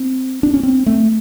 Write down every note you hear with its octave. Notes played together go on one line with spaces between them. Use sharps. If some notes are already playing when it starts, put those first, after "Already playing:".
Already playing: C4
D4
C#4
C4
A3